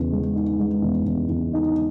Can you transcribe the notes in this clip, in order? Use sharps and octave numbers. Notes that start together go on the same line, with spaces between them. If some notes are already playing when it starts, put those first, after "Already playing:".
Already playing: E2 C#3
G#3
D#4
G#3
E2
E2
E2
D#4